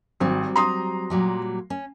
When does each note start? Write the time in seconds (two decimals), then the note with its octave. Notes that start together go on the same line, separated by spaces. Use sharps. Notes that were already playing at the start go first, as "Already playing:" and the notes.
0.20 G#1 F#3 G3 C4
0.56 A#5 C6 D#6
1.10 A#2 F#3 G3
1.70 C#4